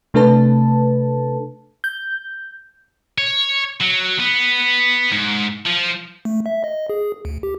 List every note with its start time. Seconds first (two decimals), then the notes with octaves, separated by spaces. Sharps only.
0.14 C3 A3 D4 A4 B4 A5
1.84 G6
3.18 C#5
3.81 F#3
4.20 B3
5.12 G#2
5.66 F3
6.25 A3
6.46 E5
6.64 D#5
6.90 G#4
7.25 D2
7.43 G4